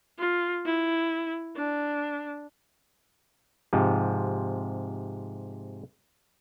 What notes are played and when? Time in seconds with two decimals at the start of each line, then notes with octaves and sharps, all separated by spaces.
0.18 F4
0.65 E4
1.56 D4
3.73 G#2 C3 F3